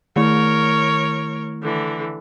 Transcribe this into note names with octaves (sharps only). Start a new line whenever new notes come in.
D#3 A3 E4 A#4 C#5
D3 E3